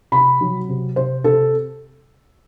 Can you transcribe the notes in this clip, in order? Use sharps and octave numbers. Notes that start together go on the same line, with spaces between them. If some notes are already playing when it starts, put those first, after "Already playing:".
C3 B5
F#3
C3
C3 C5
C3 A4